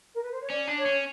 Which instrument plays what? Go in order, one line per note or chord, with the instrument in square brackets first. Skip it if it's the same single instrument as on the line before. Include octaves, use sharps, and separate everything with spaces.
[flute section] A#4
B4
C5
C#5
[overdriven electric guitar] C#4 [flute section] D5
[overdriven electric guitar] D4
[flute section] C#5
[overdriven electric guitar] C#4